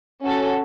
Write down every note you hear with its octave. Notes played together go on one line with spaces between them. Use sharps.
C#4 F#4 A4